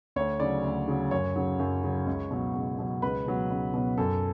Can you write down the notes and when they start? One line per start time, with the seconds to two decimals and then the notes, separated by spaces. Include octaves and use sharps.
0.16 D2 C#5
0.40 C#3 F#3 D5
0.64 D2
0.88 C#3 F#3
1.11 F#2 C#5
1.36 C#3 F#3
1.60 F#2
1.84 C#3 F#3
2.07 C#2
2.31 B2 F#3
2.55 C#2
2.79 B2 F#3
3.02 C#2 B4
3.26 B2 F#3
3.50 C#2
3.74 B2 F#3
3.98 F#2 A4